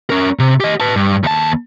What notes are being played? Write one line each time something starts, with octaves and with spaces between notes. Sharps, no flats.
C#4 A#4
C3
G4 D#5
B4 A5
G2
D#2 A5